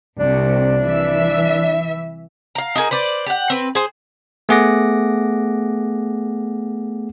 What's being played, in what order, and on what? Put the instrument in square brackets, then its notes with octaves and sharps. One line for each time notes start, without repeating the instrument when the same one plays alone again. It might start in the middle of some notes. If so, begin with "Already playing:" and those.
[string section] C2 C3 [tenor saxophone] D4
[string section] E3 E5
[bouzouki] F5 A#5
D#4 F#4 G#4 A#4
B4 C5 D5
G4 F#5
C4 B4
G#4 C5
[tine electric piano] A3 B3 G#4 F#5 D6 A#6